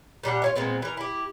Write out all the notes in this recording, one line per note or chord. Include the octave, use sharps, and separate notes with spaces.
A#2 G3 D4 F#5
F4 C#5 E5
A#2 G#3 B3 C4
E3 A#4
E4 G4